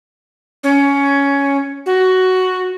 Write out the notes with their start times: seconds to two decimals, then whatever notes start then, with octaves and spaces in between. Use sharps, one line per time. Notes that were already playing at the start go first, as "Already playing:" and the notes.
0.64 C#4
1.86 F#4